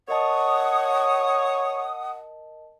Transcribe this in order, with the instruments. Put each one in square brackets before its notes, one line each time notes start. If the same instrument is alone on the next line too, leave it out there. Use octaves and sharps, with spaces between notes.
[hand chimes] A#4 D#5 A5 [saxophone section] C#5 [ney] F#5 [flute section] D#6